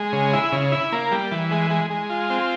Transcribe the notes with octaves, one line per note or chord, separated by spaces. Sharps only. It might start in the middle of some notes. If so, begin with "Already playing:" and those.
Already playing: G#3
C#3
E4
C#3
E4
A#3
G3
E3
G#3
G#3
G#3
F4
C4